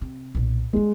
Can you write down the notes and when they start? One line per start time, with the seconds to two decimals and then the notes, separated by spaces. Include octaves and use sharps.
0.01 C3
0.35 B1 A#2
0.73 D3 G3 G#3